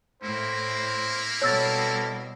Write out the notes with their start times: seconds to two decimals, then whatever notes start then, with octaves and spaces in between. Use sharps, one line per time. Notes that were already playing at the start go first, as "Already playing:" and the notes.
0.22 A2 A#3 C4 E4 C5
1.42 B2 G3 A4 C#5 E6 A6